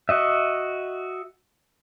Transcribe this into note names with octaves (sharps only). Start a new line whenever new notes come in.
F#4 D#5 E5